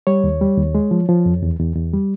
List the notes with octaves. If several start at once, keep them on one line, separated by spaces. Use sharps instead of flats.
G3 C#5
D#2
G3
D#2
G#3
F3
F3
F2
E2
E2
E2
G3